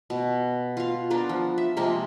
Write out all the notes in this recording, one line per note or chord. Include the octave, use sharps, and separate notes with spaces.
B2
F4 F5
B3 D4 F4 A#4
F3
E5
C3 F3 G#3 A#3